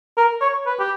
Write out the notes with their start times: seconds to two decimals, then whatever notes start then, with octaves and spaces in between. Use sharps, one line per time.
0.18 A#4
0.41 C#5
0.66 B4
0.79 G4